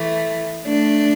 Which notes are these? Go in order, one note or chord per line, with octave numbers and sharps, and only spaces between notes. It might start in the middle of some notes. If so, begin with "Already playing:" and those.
Already playing: E3 A3
A3 D4